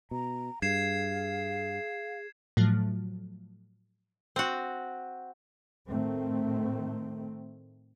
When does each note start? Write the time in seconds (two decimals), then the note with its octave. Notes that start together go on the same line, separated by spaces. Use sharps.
0.11 B2 A#5
0.62 G2 G#4 F5 G#6 C7 E7
2.57 A2 F3 F#3 A3
4.36 C4 F#4
5.89 A2 D#3 A3 C4